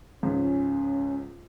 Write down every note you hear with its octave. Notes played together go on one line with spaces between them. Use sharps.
C#2 G#2 F3 C#4